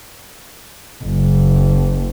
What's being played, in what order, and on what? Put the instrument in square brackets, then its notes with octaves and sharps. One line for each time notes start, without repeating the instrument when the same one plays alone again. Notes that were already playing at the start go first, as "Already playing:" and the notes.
[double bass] F#1